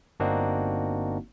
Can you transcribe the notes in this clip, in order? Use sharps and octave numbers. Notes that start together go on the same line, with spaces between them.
G1 A#3 C4 D4 D#4 F#4